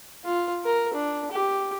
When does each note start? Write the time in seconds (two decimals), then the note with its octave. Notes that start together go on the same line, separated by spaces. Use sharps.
0.25 F4
0.65 A#4
0.94 D4
1.32 G4